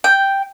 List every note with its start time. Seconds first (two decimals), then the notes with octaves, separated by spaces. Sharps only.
0.04 G5